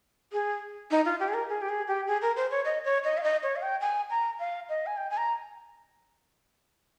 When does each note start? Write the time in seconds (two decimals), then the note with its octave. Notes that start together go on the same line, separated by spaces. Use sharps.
0.32 G#4
0.91 D#4
1.05 F4
1.20 G4
1.28 G#4
1.34 A#4
1.49 G#4
1.62 G4
1.69 G#4
1.88 G4
2.07 G#4
2.22 A#4
2.36 C5
2.51 C#5
2.65 D#5
2.85 C#5
3.04 D#5
3.18 F5
3.23 D#5
3.43 C#5
3.56 F5
3.62 G5
3.81 G#5
4.10 A#5
4.39 F5
4.69 D#5
4.86 G#5
4.97 G5
5.10 G#5
5.17 A#5